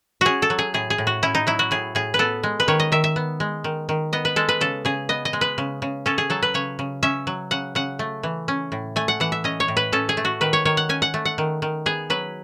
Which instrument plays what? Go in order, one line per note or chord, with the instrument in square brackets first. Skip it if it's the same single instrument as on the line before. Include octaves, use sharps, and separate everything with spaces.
[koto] C#4 F#4 G#4
A4
F#3
G#4
A2 G#4
G#4
A2
F#4
C#4 E4
D#4
F#3 E4
F#4
A2 G#4
A2 G#4
B4
B3 A4
G#3
B4
D#3 C#5
D#5
D#3 E5
E5
B3
G#3
D#3
D#3
B3 D#5
B4
G#3 A4
B4
C#3 A4
C#3 G#4
B3 D#5
D#5
G#3
B4
C#3
C#3
C#4 A4
G#4
F#3 A4
B4
C#3 C#5
C#3
C#4 E5
F#3
C#3 F#5
C#3 F#5
A3
E3
C#4
A2
A3 G#5
F#5
E3 F#5
E5
C#4 D#5
C#5
A2
B4
C#4 A4
G#4
A3
F#4
D#3 B4
C#5
D#3 C#5
F#5
C#4 G#5
F#5
A3
F#5
D#3
D#3
B3 G#4
F#3 B4